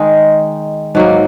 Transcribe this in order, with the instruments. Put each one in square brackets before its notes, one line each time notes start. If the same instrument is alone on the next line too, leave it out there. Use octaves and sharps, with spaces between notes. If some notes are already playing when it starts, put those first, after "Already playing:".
Already playing: [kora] D#3 G#3 D#4
G#2 F#3 A#3